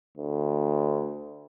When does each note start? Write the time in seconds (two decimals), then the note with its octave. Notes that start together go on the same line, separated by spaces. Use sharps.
0.18 D2